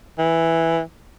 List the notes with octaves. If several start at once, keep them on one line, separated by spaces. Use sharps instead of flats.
E3